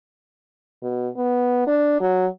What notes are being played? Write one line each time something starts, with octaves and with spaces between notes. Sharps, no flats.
B2
B3
D4
F#3